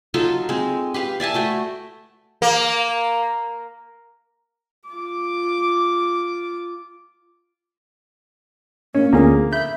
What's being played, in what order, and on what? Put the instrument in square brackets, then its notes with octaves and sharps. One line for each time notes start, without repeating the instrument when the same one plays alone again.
[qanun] F#3 D#4 F4 A4
G#3 C4
G4 B4 F5
D5 E5 G#5 A5
A3 F#4 G5
[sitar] A#3
[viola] F4 D6
[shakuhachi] A#3 [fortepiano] C#4
[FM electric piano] D2 D3 F3 [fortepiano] A#3 [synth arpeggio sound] B3 C#4 [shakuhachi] G#4
[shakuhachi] E5 [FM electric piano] B5 [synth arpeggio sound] G6